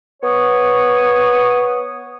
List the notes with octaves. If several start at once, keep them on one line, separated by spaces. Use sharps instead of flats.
B3 C#5 C#6 D#6